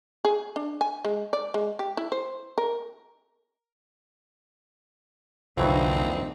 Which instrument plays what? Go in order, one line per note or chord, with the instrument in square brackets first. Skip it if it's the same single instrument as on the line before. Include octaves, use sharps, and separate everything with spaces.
[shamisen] G#4
D4
G#5
G#3
D5
G#3
G4
E4
C5
A#4
[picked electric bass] C2 [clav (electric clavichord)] F2 E3 F#3 [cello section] D3 A#3 D#4 [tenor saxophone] C4